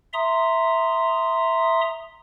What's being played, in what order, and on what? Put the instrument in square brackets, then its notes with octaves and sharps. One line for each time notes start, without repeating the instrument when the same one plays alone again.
[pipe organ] E5 A#5 C6 D#6